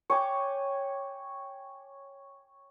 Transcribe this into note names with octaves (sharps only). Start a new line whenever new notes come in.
C#5 G5 G#5 D6